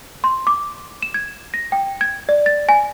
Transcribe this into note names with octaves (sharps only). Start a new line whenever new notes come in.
C6
D6
E7
G#6
A#6
G5
G#6
D5
A6
G#5